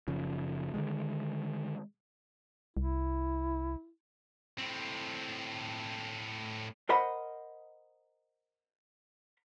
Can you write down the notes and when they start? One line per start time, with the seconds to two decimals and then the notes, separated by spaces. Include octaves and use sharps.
0.08 F#1 C#3 F3
0.74 D3 D#3 G#3
2.77 C2 E4
4.59 A2 C4
6.89 A#4 C5 D#5 F#5 B5